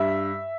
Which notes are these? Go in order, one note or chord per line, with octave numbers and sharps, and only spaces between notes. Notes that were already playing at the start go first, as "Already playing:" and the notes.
Already playing: G2 E5